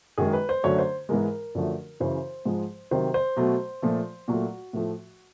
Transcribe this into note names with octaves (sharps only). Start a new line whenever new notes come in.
F#2 D#3 G#3 G#4
B4
C5
F#2 D3 F#3 A3 C#5
C5
G#2 E3 G#3 A#4
F#2 D3 F3 A3
F#2 C#3 E3 C5
G#2 F3 G#3
C3 D#3 F#3 C5
C5
B2 F#3 A3
A#2 F3 A3
A#2 F#3 A3 F#4
A2 F3 A3